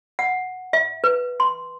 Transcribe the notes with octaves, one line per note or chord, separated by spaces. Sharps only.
F#5
E5
B4
C6